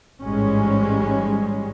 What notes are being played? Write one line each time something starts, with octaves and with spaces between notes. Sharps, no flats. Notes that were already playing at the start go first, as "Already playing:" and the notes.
A1 G#2 G3 G#3 C#4